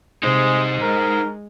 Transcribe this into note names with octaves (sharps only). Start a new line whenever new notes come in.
C3 G#3 D#4 C5
G#3 A#4